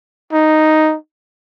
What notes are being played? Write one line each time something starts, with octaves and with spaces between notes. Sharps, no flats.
D#4